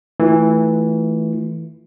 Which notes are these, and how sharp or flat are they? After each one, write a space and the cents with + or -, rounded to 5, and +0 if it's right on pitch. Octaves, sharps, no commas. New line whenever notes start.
E3 -15 A3 +0 F4 +0